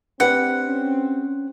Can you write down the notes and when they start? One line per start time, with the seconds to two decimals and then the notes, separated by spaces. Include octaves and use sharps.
0.20 C4 D4 G4 B4 F#5
0.66 C#4